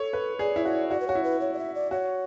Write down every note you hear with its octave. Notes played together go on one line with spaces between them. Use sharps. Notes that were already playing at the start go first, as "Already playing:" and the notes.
Already playing: A4 C#5
B4
G#4 D5
E4
F#4 D5
F#4 D5
B4
F#4 C#5
E4
B4
C#5
D5
E5
D5
F#4 C#5